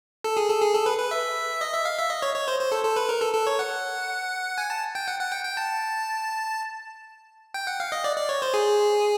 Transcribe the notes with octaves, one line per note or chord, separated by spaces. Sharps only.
A4
G#4
A4
G#4
A4
B4
B4
E5
D#5
E5
F5
E5
D#5
C#5
C#5
C5
C5
A4
A4
B4
A#4
A4
A4
C#5
F#5
G#5
A5
G5
F#5
F#5
G5
G5
A5
G5
F#5
F5
D#5
D5
D5
C#5
C5
G#4